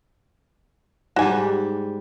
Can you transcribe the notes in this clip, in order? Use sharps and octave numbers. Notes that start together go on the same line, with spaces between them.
G#2 G3 F#4 G#5